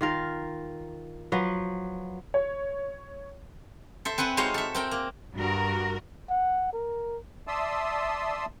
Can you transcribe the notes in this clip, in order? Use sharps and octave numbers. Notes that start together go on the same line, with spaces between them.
D#3 F4 A#4
F3 F#3 B4
C#5
A4 C5 E5
C4 B4 F#5 G#5
G#3 D#4 F#4 C5 C#5 F5
A4 E5
C4 A#4 G5
A#3
G2 F#4 A#4
F#5
A#4
D5 E5 A5 C6 D#6 E6